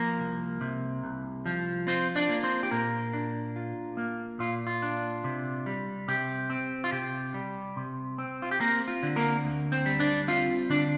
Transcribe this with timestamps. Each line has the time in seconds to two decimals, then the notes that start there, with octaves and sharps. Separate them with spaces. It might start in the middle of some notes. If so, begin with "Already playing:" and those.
Already playing: F3 A#3 A#4
0.20 C2
0.61 C3
1.04 C2
1.46 F3
1.87 C4 F4 C5
2.16 D4 D5
2.29 A#3
2.43 C4 C5
2.63 G4
2.71 A#2 A#3 A#4
3.13 D4
3.56 F4
3.97 A#3
4.39 A#2 F4
4.67 F4
4.82 D4
5.24 C3
5.66 G3
6.08 C3 G4
6.50 C4
6.84 F4
6.92 C3 G4
7.34 G3
7.76 C3
8.18 C4
8.42 F4
8.51 G4
8.60 A#3 C4 A#4
8.88 F4
9.03 D3
9.16 A#3 A#4
9.44 D2
9.72 C4 C5
9.86 G3
10.00 D4 D5
10.28 C4 F4 F5
10.70 D3 D4 D5